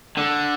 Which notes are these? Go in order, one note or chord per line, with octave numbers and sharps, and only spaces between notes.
D3